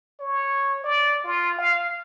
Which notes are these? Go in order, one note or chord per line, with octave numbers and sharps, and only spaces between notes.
C#5
D5
F4
F5